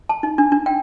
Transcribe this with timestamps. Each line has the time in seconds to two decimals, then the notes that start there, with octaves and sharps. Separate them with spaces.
0.09 A5
0.23 D#4
0.38 D4
0.52 D4
0.66 G5